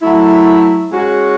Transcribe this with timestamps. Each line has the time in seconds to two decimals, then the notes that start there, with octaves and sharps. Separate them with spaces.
0.02 F#3 A3 E4
0.92 G#3 C#4 F#4